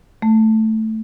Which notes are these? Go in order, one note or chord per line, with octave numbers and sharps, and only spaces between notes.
A3